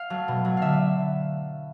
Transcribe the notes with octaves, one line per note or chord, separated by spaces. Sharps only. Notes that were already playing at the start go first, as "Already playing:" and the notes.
Already playing: F5
F#3 A3
B2
F#3 A3
D3 E5 F5